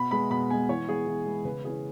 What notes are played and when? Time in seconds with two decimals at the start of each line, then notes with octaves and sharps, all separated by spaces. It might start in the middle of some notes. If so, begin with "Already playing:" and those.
Already playing: B2 B5
0.11 G#3 B3 B5
0.31 B2 B5
0.50 G#3 B3 G#5
0.69 E3 C#5
0.89 G#3 B3 G#4
1.07 E3
1.26 G#3 B3
1.45 C#3 B4
1.65 E3 C#4 G#4